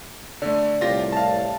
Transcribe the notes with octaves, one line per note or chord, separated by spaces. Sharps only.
D3 A3 D5
C2 A2 F4 G4 A#6
F5 A5